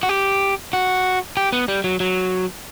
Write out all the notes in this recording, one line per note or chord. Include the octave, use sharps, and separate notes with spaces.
F#4
G4
F#4
G4
B3
G3
F#3
F#3